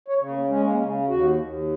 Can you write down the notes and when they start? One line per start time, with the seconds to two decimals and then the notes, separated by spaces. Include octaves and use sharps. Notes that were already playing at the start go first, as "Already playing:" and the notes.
0.08 C#5
0.19 C#3
0.29 A#3
0.48 G#3 C#4
0.61 A#3
0.74 C#3 C#4
1.08 D#2 F#4
1.38 D#2